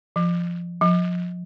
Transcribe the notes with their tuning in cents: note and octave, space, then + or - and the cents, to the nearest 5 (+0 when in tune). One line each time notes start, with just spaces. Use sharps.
F3 -10
F3 +25